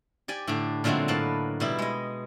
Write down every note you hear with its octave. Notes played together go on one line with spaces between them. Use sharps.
G4 D5 G#5
A2 D3 D4 G4
A#2 D3 F#3 G#3 A3 C4
A2 A#3 B4 A5
B2 G3 E4
G#3 D#5